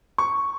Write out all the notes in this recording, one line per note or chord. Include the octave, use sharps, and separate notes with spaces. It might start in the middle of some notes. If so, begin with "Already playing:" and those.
C#6